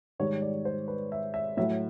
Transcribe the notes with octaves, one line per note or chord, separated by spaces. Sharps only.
G#2 D#3 G3 C#5
D5
C5
B4
E5
E5
A2 F#3 E5